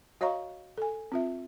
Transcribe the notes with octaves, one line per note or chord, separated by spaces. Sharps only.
F#4 C#5 D#5 F5 A#5 C#6
A4 G#5
C4 F4 E5